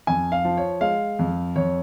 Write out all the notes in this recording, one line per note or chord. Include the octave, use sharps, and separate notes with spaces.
F2 G#5
F5
F3
C#5
G#3 F5
F2
F2 C#5